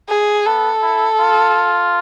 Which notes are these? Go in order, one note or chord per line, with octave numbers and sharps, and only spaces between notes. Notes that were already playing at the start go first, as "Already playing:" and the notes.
G#4
B3 A4
E4
F4